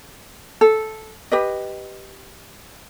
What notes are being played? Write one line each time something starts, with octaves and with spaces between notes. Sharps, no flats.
A4
G4 B4 D#5